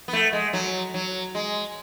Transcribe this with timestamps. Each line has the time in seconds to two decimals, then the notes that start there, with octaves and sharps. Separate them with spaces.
0.08 B3
0.13 A3
0.33 G#3
0.53 F#3
0.94 F#3
1.35 G#3